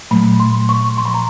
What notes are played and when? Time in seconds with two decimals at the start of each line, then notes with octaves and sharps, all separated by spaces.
0.11 A#2 F#3 A3 B5
0.40 C6
0.69 C#6
0.97 A#2 F3 A3 C6
1.05 B5
1.14 A#5